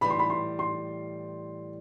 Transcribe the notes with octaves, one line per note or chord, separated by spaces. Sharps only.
A2 E3 G3 B5
C6
B5
C6
C6